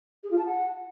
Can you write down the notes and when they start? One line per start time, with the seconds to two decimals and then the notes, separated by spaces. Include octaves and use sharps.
0.24 G#4
0.31 F4
0.38 A5
0.46 F#5